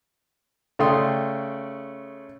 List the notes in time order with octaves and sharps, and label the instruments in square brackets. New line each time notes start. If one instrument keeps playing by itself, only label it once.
[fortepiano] C#3 A3 D5 G5 C6 D#6